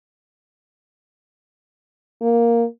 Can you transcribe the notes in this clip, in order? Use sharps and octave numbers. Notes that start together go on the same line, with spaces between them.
A#3